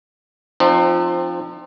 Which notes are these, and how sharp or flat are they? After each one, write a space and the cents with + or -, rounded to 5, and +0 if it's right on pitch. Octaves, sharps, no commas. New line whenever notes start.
F3 +0 C4 +15 D#4 -45